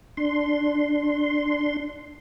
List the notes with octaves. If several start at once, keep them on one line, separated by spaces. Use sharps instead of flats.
D4 C6